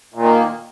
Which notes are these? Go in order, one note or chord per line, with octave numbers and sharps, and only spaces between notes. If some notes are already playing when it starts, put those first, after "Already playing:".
A#2 D#3 A#3